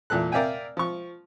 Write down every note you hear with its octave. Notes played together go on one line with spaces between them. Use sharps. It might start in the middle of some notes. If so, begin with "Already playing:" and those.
E2 A#2 A4 F#6
A#4 D5 E5 F5 G5 G#5
F3 C#6